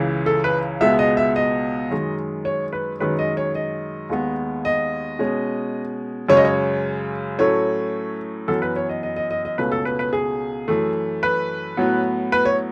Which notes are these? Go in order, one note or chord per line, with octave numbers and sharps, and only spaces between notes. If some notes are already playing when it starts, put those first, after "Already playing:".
Already playing: C#2 C#3 E3
A4
B4
C#2 B2 G#3 B3 E5
D#5
E5
D#5
F#2 D#3 G#3
C#5
B4
F#2 D#3 G#3 C#4 B4
D#5
C#5
D#5
D#2 D#3 G#3 B3
D#5
B2 G#3 C#4
F#2 C#3 G#3 C#4 C#5
D#5
C#5
A2 F#3 A3 C#4 C#5
F#2 E3 B3 A4
B4
C#5
D#5
D#5
D#5
D#5
D#5
C#2 B2 A3 C#4 B4
A4
B4
B4
G#4
F#2 E3 A3
B4
A2 F#3 B3
B4
C#5